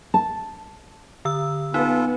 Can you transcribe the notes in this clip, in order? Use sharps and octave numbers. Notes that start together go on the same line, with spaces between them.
A5
D3 E6
B3 D#4 F4 A4